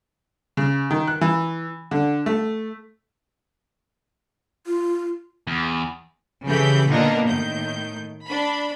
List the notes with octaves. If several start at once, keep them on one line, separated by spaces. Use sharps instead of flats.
C#3
D#3
F#6
E3
D3
A3
F4
E2
C#3 E3 G4 A4 B5 G6
A#2 D3 A#3 B3 D4 D#4
A2 D#3 G6
D4 B5